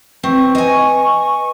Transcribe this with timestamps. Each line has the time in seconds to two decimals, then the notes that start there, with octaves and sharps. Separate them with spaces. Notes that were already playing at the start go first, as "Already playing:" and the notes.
0.24 C4 B4 C#6
0.55 D#5 G#5